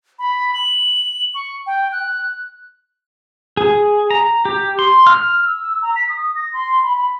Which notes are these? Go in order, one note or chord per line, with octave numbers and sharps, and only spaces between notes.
B5
F#7
C#6
G5
F#6
G#4
A#5
G4
C6
F6
E6
A#5
B6
D#6
A#6
C6
B5
B5